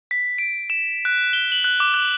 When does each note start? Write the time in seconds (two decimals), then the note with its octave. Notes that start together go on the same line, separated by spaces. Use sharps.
0.11 B6
0.38 D7
0.70 E7
1.05 F#6
1.33 G7
1.52 F#7
1.64 F#6
1.80 D6
1.94 F#6